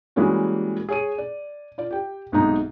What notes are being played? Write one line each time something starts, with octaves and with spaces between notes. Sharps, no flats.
E3 G3 G#3 A#3 C#4 F#4
G#4 C#5 D#7
D5
F4 D5
G4 G5
B1 G#2 C3 D#4 A#5